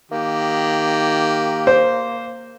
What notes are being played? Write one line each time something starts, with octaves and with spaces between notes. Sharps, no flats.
D#3 A#3 G4
C5